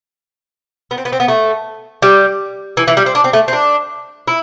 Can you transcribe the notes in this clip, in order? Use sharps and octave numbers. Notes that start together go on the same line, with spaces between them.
B3
C4
B3
C4
B3
A3
G3
E3
E3
G3
C4
D4
C4
A3
C4
D4
E4